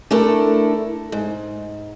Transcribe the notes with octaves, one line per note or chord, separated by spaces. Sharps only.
A3 D4 E4 A4 A#4
G#2